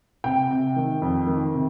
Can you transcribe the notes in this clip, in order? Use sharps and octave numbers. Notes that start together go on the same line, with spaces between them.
C3 G5
C3
D#3
F2
D#3
C3